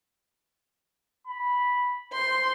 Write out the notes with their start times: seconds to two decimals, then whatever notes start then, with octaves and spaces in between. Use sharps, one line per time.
1.27 B5
2.13 C5 C6